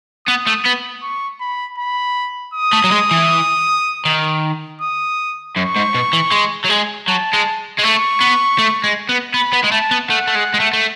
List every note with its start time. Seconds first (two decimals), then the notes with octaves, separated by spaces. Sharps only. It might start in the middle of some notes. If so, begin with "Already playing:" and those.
0.28 B3 D#6
0.47 A3
0.65 B3
1.02 C#6
1.41 B5
1.78 B5
2.54 D#6
2.73 A3
2.84 F#3
2.92 G#3
3.11 E3
4.05 D#3
4.81 D#6
5.56 F#2 C#6
5.76 G#2
5.94 B2
6.13 E3
6.32 G#3
6.65 F#3
6.70 G#3
7.08 F#3 A5
7.33 G#3
7.78 G#3
7.83 A3 C#6
8.21 B3
8.58 A3
8.84 G#3
9.09 B3
9.34 B3 B5
9.53 B3
9.64 G#3
9.72 A3 A5
9.91 B3
10.10 A3 F#5
10.27 A3
10.35 G#3
10.54 G#3
10.60 A3
10.73 A3